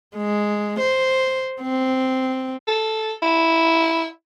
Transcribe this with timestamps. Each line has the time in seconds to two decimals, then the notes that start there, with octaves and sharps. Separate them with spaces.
0.16 G#3
0.80 C5
1.61 C4
2.68 A4
3.22 E4